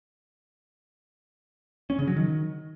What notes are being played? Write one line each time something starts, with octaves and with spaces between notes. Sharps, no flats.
C#4
C#3
F#3
D#3